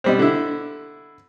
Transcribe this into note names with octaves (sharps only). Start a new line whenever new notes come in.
B2 G3 C4
D3 E4